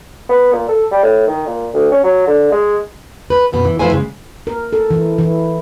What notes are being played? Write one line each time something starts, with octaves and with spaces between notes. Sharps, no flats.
B3
A#2
A4
G3
A2
D#3
A#2
D2
C#4
F#3
D3
G#3
B4
F#2 B2 B3
E3
A2 F3 E4 B4 C5 G#5
C#3 G#3
A#4
A4
E3
E3